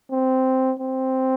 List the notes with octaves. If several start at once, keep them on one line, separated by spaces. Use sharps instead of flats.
C4
C4